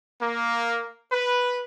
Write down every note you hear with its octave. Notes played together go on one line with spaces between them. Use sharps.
A#3
B4